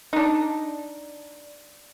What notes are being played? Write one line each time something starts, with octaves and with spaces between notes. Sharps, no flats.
D4 D#4